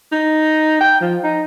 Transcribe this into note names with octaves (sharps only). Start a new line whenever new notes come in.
D#4
G5
F3
D#4